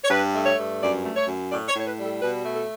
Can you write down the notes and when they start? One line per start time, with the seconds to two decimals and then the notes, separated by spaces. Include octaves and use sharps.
0.04 C#5
0.10 G2 B4
0.34 A3
0.46 C#5
0.57 G2
0.81 F#2 D5
1.04 A3
1.16 C#5
1.27 F#2
1.51 A2 D5
1.69 C#5
1.74 A2
1.80 C#5
1.86 B4
1.98 G3
2.04 A4
2.21 B2 B4
2.44 A3
2.56 A4